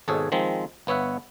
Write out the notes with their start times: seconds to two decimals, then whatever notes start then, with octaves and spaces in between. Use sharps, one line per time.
0.08 G#1 G#2 B2 G#4 A4 C#5
0.32 D#3 F3 G#3 C4
0.87 G1 B3 C#5 E5 F#5